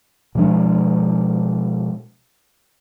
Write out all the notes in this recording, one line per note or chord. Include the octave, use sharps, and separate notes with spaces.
B2 F3 G#3 D4